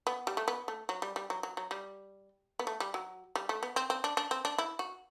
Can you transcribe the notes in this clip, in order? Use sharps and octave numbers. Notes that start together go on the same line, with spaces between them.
B3
G3
A3
B3
A3
F#3
G3
G3
F#3
F#3
F#3
G3
B3
A3
G3
F#3
G3
A3
B3
C4
C4
D4
D4
C4
D4
E4
F#4